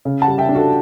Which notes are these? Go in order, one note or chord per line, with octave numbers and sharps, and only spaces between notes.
C#3
F#5 A5
G3
E5 G5
D4
F#4 A4